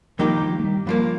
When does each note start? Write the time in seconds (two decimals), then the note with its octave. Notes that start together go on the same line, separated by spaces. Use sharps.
0.19 G2 D#3 F3 A#3 D#4 G4
0.42 F3
0.59 A3
0.64 G3
0.86 G2 F3 G3 A#3